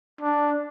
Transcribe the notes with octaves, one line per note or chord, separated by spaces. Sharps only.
D4